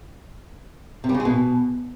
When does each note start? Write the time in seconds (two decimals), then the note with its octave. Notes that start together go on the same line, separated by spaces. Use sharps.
1.04 C3
1.09 G3
1.14 C#3
1.20 G#3
1.25 B2